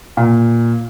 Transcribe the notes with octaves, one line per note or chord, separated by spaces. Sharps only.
A#2